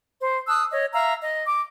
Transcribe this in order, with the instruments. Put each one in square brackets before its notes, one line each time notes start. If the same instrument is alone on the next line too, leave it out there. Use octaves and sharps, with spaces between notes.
[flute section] C5
A5 D#6 E6 F#6
C#5 D#5
E5 F5 A#5 E6
D#5
D6